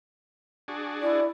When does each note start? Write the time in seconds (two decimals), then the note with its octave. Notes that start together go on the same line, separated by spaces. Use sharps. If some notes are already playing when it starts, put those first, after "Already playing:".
0.68 D4 F#4 G#4
1.02 E4 D5